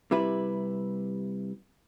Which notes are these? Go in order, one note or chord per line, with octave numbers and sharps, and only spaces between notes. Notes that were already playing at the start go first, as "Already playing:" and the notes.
C3 G3 E4 B4